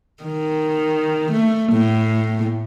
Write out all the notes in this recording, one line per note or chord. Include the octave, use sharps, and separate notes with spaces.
D#3
A3
A2